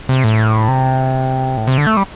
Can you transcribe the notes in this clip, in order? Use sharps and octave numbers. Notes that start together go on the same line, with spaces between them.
C3
A2
C3
A2
C3
D3
A3
G3